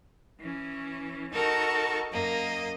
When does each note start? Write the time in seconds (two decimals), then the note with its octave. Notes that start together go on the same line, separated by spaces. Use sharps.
0.40 E3 C#4
1.32 D#4 F#4 A4 A#4 A5 C#6
2.12 F#2 A#3 D#5